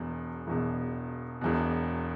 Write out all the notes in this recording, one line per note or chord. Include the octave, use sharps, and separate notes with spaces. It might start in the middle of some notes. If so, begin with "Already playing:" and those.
Already playing: E1 E2 B2
E1 E2 B2
E1 E2 B2